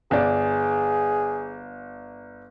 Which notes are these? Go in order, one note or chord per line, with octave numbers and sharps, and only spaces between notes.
G1 G#4 D5